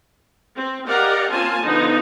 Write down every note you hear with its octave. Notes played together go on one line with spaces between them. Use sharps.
C4
G4 A#4 D5 D#5 F5 F#5
A#3 C4 C#4 F4 G#5 A5
D3 F3 B3 D#4